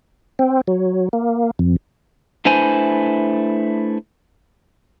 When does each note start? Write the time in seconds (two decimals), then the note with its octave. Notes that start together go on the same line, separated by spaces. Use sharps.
0.39 C4
0.68 F#3
1.13 A#3
1.59 F2
2.45 A3 D4 E4 B4 C5 G#5